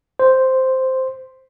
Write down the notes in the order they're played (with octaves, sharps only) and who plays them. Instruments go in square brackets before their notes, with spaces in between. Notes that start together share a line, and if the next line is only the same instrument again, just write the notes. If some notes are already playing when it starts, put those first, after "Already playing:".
[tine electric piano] C5